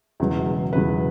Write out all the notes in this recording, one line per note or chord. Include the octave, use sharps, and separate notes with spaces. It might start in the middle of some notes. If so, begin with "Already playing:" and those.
E1 E2 C#3 F#3
E1 E2 C#3 F#3 B4